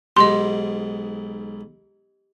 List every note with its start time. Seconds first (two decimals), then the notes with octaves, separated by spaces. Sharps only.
0.17 B1 G#2 G4 D#5 C6